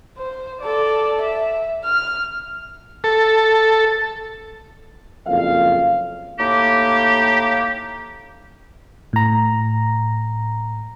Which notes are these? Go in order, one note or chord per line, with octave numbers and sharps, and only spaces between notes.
C5
A4 D5
E5
F6
A4
F#1 F2 F5
A2 A#3 D#4 G4
A2 A#5